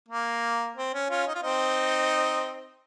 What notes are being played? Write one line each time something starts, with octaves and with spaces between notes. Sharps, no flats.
A#3
C4
C#4
C#4 F4
D#4
F4
C4 D#4